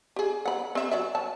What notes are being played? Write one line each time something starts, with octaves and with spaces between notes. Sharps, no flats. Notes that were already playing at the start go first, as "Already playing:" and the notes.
G4 G#4
F#5 B5
C4 E5
F#3 D5 E5
C#5 A5